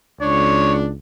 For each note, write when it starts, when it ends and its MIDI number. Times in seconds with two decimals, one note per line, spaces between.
0.21 0.98 37
0.21 0.90 62
0.21 0.73 73